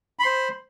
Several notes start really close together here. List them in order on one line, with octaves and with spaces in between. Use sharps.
B5 C6 C5